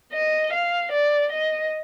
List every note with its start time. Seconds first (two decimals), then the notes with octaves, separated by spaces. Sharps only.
0.13 D#5
0.52 F5
0.91 D5
1.32 D#5